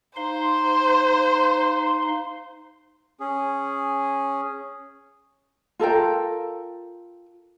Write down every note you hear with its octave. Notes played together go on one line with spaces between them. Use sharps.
D#4 C5 F5 C6
C#4 G#4
F4 A4 A#4 G5